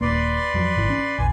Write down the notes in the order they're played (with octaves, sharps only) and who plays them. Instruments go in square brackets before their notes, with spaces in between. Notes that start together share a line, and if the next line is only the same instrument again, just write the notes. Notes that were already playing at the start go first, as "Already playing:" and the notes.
[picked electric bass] D#1 A#3 [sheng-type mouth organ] B4 D5 C6
[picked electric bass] F2 F3 F#3
G#1 E3
C#4
[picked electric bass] A#1 E2 [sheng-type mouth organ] G#5